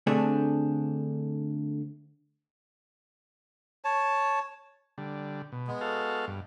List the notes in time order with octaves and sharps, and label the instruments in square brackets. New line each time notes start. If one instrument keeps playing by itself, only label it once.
[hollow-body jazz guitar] D3 A3 C4 D4 G#4
[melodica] C#5 A5
[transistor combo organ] D3 G3
B2
[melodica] G#3 B3
[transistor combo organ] F#4 A4 F5
G2